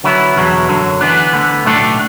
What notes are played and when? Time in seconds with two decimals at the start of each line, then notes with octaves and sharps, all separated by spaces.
0.04 D3 F#3 B3 E4
0.36 E2 B2 F#3
0.69 F#2 D3 F#3
1.01 E3 B3 D4
1.32 D2 D3 B3
1.65 B1 A2 A3 D4 A4